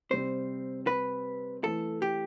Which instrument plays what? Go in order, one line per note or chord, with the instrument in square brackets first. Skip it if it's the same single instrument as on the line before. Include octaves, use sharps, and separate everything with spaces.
[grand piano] C3 G3 C4 [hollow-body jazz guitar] C5
[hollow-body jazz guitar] B4
[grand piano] E3 A3 E4 B4 [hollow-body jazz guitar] A4
[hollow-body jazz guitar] G4